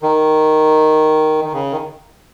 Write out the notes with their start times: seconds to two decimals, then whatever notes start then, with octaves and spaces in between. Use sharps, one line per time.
0.02 D#3
1.45 D#3
1.53 C#3
1.72 D#3